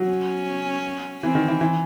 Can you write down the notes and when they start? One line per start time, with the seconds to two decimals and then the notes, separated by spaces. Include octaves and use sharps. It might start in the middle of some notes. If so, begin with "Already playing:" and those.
Already playing: F#3
0.08 C#4
1.23 E3 C4
1.35 D#3
1.48 E3
1.61 E3